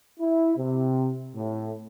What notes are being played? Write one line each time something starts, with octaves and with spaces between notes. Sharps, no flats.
E4
C3
A2